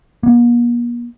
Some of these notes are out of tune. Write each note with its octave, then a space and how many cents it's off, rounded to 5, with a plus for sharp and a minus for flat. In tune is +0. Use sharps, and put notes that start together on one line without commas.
A#3 +45